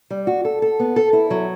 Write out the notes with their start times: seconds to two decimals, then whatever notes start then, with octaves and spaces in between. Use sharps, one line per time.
0.10 G3
0.27 F#4
0.45 A4
0.62 A4
0.80 B3
0.96 A4
1.13 E4
1.30 F#3